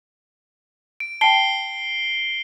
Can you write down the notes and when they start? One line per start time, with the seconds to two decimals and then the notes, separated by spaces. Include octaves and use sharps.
1.00 D7
1.21 G5 A5 C7 D7 G7